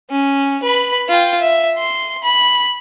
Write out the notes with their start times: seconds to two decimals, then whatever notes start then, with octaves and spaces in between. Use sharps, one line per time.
0.10 C#4
0.63 B4 B5
1.09 F4 G5
1.41 E5
1.78 C6
2.23 B5